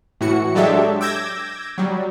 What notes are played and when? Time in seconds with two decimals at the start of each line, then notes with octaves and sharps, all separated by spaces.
0.21 A2 E3 F#4 C#7
0.55 F#3 G#3 D4 G4 A4 E5
1.01 D6 E6 G6 G#6 A#6
1.78 F#3 G3